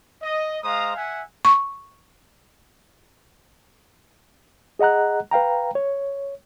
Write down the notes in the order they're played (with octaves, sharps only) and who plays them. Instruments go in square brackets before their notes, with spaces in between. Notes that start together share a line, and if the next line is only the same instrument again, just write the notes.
[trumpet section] D#5
G#3 C5 F5 A#5 D#6
E5 F#5 G#5
[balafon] C#6
[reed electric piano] G#4 D#5 F#5 A#5 F#6
B4 F5 G5 A#5
C#5